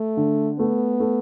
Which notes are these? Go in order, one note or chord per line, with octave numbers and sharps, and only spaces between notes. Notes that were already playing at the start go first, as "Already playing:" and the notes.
Already playing: A3
D3
A3 B3
A3